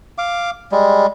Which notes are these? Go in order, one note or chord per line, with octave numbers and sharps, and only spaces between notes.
F5 D6
G3 G#3